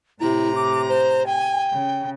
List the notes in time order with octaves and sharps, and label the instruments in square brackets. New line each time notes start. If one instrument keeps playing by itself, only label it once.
[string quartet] A2 C3 A#5 [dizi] E4
[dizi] D6
C5
[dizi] G5 [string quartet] G#5
[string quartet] C#3